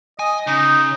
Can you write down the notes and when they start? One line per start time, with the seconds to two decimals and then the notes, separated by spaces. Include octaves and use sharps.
0.19 D#5 G#5
0.47 C#3 D#4